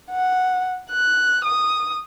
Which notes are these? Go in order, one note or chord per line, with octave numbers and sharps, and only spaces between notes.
F#5
F#6
D#6